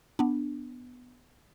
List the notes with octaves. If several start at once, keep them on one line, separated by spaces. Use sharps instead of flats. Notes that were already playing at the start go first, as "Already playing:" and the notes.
B3 D4